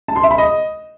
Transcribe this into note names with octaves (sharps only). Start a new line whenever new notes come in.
A5
C6
E5
B5
D#5